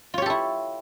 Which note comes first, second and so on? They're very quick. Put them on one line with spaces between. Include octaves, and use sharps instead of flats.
F4 C#5 G4 A4 E4